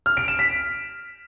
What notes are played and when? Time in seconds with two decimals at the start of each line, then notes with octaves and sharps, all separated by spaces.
0.06 F6
0.17 D7
0.28 E7
0.39 B6